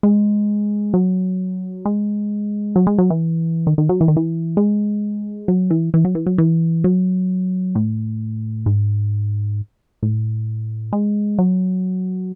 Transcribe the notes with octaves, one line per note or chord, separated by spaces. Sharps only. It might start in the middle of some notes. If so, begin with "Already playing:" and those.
G#3
F#3
G#3
F#3
G#3
F#3
E3
D#3
D#3
F#3
E3
D#3
E3
G#3
F#3
E3
E3
F#3
E3
F#3
E3
F#3
A2
G#2
A2
G#3
F#3